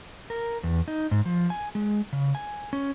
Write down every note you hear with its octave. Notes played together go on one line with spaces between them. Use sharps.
A#4
E2
D#4
G#2
F3
G#5
G#3
C#3
G#5
C#4